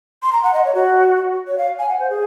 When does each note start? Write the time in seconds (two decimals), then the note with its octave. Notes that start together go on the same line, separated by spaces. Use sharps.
0.23 C6
0.33 A#5
0.43 F#5
0.54 D#5
0.64 C#5
0.75 F#4
1.48 C#5
1.58 F5
1.79 G#5
1.89 F#5
2.00 C5
2.10 G#4